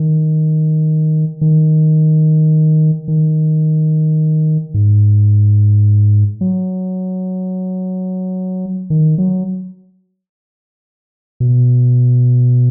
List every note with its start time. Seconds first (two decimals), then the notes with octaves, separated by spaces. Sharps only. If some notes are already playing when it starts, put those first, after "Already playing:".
Already playing: D#3
1.41 D#3
3.08 D#3
4.74 G#2
6.41 F#3
8.90 D#3
9.18 F#3
11.40 B2